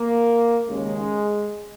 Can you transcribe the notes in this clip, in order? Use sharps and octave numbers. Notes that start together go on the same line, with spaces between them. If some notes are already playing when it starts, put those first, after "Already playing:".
Already playing: A#3
D#2 C#3 G#3